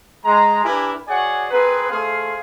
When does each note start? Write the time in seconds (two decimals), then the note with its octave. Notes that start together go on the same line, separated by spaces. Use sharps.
0.25 G#3 A#5
0.64 D4 E4 G4 A#4 B4 G#5
1.08 F#4 G#4 C#5 D5 F#5 G#5
1.51 C4 G#4 A#4 B4
1.90 A3 G#4 C5 F5